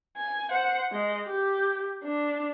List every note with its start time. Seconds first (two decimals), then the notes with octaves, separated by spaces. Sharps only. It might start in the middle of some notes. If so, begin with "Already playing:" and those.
0.17 G#5
0.51 C5 F#5
0.92 G#3 D#5
1.26 G4
2.04 D4